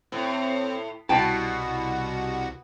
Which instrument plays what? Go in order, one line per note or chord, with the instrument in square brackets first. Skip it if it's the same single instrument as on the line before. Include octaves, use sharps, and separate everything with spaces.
[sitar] A2 [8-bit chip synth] C4
[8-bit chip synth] C2 F#4 [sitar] B2 [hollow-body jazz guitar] G5 A5